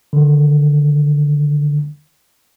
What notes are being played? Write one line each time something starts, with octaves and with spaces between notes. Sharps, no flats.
D3 D#3